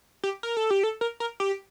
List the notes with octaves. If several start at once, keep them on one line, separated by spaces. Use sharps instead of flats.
G4
A#4
A4
G4
A4
A#4
A#4
G4